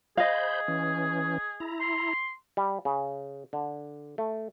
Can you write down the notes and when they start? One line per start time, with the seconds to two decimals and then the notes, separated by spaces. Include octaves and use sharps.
0.17 G#4 C5 D#5 F5 B5 G6
0.68 E3 C#4
1.60 E4 A#5
1.80 C6
2.57 G3
2.85 C#3
3.53 D3
4.18 A3